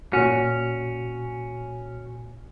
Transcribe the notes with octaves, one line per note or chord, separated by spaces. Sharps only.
A#2 C#4 F#4